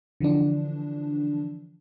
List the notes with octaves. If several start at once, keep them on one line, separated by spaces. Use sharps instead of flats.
D3 E3 F3 D4